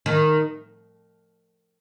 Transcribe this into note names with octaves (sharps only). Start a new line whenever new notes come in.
D#3